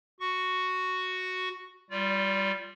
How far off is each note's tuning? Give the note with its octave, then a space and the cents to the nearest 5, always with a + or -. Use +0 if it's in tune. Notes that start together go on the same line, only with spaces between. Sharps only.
F#4 +0 C#6 +0
G3 +0 F4 -5 D5 -30